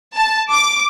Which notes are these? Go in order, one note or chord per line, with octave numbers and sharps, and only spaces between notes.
A5
D6